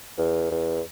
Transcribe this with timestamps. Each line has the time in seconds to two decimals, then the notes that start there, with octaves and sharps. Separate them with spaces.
0.18 E2
0.51 E2